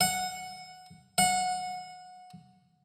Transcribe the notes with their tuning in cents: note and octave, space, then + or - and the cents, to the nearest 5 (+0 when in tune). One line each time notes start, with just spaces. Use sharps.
F#5 -5
F#5 -20